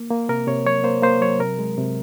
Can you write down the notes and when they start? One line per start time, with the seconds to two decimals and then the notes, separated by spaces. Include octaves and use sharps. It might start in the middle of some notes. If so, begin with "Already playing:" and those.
Already playing: A#3
0.10 A#3
0.29 C3 A#4
0.47 C3 C#5
0.65 F#3 C#5
0.84 A#3 C5
1.02 A#3 C5
1.21 F#3 C#5
1.40 C3 A#4
1.59 G#3
1.78 C3